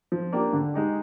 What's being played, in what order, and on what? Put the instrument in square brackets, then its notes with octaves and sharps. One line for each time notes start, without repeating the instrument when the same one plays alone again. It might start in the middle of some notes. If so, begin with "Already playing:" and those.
[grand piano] F3
A#3 D4 G4
D3
G#3 D#4 G4